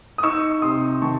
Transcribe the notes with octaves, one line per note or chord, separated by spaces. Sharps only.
D#6
D#4 C#6 E6
C3 C6 D#6
D#3 A5 C#6